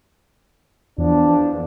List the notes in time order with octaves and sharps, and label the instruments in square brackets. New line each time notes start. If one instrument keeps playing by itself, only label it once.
[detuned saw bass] E2 [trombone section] F3 D4